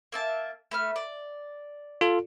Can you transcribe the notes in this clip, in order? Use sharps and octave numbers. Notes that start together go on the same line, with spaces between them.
A#3 E5 A5
A3 B4 F6
D5
F4 A4